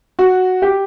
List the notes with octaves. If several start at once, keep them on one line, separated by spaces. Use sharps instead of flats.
F#4
G4